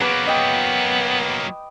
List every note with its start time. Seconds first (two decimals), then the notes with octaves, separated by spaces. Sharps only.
0.01 F#3 A#3 B3 B4 B5 D6
0.27 D#5 G5